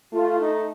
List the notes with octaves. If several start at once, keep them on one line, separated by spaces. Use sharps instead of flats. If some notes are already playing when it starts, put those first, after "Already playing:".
A3 F4
D#4